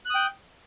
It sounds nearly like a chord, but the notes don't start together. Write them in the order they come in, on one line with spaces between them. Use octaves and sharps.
F#6 D#6 G5